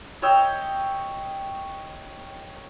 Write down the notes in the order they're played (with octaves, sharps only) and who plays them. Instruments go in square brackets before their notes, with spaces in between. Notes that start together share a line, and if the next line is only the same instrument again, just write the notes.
[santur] C#5 D#5 E5 G5